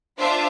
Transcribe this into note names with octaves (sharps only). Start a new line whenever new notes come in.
D4 F4 C5 E5